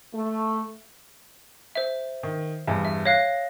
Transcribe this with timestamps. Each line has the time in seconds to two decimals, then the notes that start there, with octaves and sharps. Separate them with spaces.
0.14 A3
1.75 C5 E5
2.23 D#3
2.68 E2 G2
2.85 E5
3.05 C#5 F5 F#6 A#6